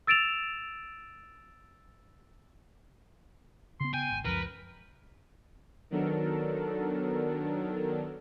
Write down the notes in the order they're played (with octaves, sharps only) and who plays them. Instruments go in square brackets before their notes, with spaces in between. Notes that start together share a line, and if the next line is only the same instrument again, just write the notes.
[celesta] E6 A6 D7 E7 F7
[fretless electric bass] C#3 B3 [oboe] C6
[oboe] G5 [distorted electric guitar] G#5
[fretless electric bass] G#1
[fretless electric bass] C#2 F#2 F3 [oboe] A#4 [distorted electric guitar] B4
[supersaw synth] D#3 F#3 B3 D4 A4 A#4